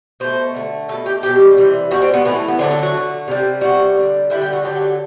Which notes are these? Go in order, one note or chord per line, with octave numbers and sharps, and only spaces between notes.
B2 A3 C5
D3 A3
B2 A3 A4
G4
B2 G3 G4
C3 E3 G3
B2 G3 F#4
C4
B3
A2 E3 A3 B3
A3
B3
D3 F#3 A3 C4
D4
F#4
D3 A3
C3 G3
C3 E3 G3 F#4
D3 G3
D3 G3 E4
G4
F#4
D3 F#3 A3 G4